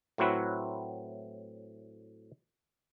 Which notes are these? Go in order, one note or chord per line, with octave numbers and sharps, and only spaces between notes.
A2 F#3 C4 E4 F#4 B4